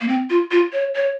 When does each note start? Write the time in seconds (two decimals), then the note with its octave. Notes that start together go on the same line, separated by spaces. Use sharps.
0.01 A#3
0.08 C4
0.30 F4
0.51 F4
0.73 C#5
0.95 C#5